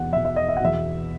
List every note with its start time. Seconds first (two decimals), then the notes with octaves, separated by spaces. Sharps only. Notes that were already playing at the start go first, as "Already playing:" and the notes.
Already playing: E2 B2 F#5
0.13 E2 B2 E5
0.25 E5
0.36 D#5
0.49 E5
0.57 F#5
0.60 E2 B2 E5